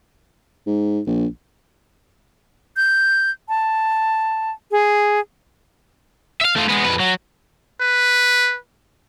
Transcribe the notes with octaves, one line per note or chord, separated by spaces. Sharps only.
G#2
A#1
G6
A5
G#4
E5 F5
A3 F4
G#3 B3
F2 B4
F#3
B4